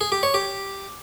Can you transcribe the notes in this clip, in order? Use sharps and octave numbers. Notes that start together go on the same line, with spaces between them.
G#4
G4
C#5
G4